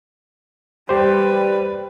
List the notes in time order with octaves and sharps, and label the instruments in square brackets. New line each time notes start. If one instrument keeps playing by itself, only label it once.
[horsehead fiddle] G3 B4 [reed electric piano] G4 C5